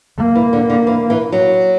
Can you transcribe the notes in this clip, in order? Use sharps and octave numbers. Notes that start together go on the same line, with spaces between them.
A#3
E3
D3
D3
E3
E3
F#3